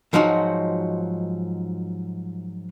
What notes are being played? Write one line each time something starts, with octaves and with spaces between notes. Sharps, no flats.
G#2 F3 F#3 D#4 F#4